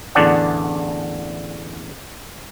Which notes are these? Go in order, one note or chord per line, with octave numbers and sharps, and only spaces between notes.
A1 E2 D3 D4 D5 F#5